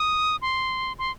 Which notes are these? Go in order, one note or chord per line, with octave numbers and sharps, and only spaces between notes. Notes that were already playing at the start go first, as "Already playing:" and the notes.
Already playing: D#6
C6
C6